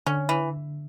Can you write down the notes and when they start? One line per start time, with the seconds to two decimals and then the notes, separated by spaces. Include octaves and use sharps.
0.06 D3 C#4
0.29 E3